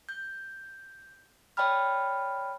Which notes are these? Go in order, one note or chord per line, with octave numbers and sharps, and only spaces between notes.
G6
C#5 D5 G5 A5 B5 F6